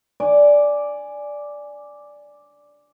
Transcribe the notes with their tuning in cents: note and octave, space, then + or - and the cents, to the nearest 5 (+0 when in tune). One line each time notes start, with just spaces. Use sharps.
D5 -5 G#5 +0